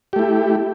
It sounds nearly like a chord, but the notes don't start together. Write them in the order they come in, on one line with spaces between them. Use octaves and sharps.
G4 A3 E4